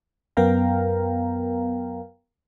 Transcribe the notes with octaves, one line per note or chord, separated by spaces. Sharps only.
F#2 B3 A#4 F5 G5 A#5